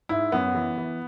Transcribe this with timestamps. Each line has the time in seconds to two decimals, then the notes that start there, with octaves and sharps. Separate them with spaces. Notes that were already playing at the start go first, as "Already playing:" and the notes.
0.09 G#2 E4
0.32 F#2 B3
0.55 E3
0.78 E3